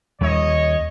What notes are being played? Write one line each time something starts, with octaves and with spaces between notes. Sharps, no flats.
D#2 G3 C#5 D#5